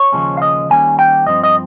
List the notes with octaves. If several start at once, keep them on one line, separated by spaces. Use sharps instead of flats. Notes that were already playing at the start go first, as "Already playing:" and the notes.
Already playing: C#5
D#2 C#3 F3 G#3 C#4
F5
D#5
D#2 D#3 G3 A#3 C#4 G#5
G5
G2 F3 C4 D#5
D#5